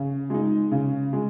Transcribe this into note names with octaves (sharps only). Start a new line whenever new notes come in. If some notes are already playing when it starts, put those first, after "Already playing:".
Already playing: C#3
G#3 D#4
C#3
G#3